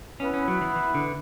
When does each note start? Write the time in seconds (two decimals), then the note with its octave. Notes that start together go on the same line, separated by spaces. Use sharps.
0.19 B3 C#4 E4 B4
0.34 C#4
0.48 F#3
0.61 E3
0.76 E3
0.95 D3